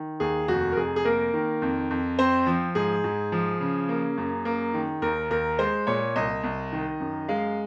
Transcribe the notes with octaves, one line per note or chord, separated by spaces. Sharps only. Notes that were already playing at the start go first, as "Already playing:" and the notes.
Already playing: D#3
D#2 G#4
F1 F#4
A#4
F1 G#4
G#4
A#3 A#4
D#3
F2
F2
C4 C5
F3
G#2 G#4
G#2
F3
C#3
A#3
F#2
A#3
D#3
D#2 A#4
D#2 A#4
G#3 C5
A#2 C#5
C2 D#5
C2
D#3
F#2
G#3 F5